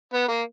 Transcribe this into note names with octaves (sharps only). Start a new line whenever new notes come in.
B3
A#3